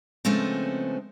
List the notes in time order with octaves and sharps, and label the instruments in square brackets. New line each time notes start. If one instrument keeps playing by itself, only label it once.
[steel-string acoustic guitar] C#3 F3 G#3 A3 B3 C4